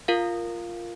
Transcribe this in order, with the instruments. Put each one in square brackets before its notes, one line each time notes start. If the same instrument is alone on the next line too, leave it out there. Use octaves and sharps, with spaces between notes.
[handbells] F4 A#4 F5